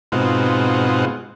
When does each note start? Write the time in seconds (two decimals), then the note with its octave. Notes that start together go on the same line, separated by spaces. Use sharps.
0.12 G#2 B2 C4 D#4 F4 F#4